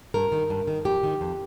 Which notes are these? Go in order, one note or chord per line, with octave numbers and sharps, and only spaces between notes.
G2 A#4
D#3
G2
D#3
F2 G4
D#3
F2